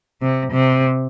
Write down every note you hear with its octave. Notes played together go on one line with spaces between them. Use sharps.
C3
C3